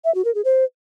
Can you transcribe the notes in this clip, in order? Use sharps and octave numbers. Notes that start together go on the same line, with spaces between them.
E5
F#4
A#4
G#4
C5